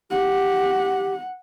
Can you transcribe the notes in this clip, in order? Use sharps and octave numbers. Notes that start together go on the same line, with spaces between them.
G4 F#5